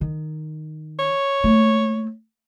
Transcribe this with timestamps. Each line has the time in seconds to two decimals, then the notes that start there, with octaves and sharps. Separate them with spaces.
0.01 D#3
0.99 C#5
1.44 A3 A#3